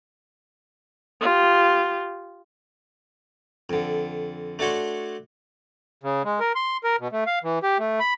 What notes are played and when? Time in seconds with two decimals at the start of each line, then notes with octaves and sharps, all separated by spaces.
1.21 F4 G4
3.70 F2 D3
4.59 A3 D4 F#4 C#5 C6
6.04 C#3
6.24 G#3
6.40 A#4
6.56 C6
6.84 A#4
7.00 B2
7.12 A3
7.27 F5
7.44 E3
7.63 G4
7.79 A3
8.00 B5